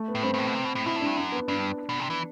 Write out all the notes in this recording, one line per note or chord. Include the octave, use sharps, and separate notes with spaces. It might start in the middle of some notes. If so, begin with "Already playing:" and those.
Already playing: A3
B3
A2
G2 C4
G2
A2
B2
C3
B2
A2
B2 E4
A2 D4
G2
F#2 D4
B3
G2 D4
B2
C3
E3 B3